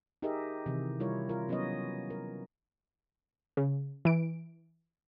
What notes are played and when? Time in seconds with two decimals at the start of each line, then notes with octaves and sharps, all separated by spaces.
0.22 D#4 G4 G#4 A#4 D#5 E5
0.66 C3 D#3 E3
1.00 G3 E4 F4 A#4 C#5
1.29 F4 A#4
1.49 F#3 B3 C#4 B4 C#5 D#5
2.10 A#4
3.57 C#3
4.05 E3 D7